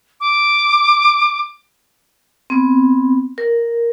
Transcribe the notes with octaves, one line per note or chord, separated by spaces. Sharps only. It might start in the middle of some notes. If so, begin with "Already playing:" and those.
D6
B3 C4
A#4